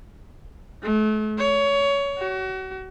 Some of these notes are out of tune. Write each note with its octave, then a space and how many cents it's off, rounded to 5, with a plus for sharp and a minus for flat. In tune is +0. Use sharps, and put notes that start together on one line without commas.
A3 -40
C#5 +20
F#4 +35